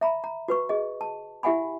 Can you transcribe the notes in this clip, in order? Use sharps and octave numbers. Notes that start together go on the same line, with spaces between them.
E5 A#5 B5
A#5
F#4 B4 C#6
G#4 D#5
A5
E4 G4 E5 F#5 G#5 B5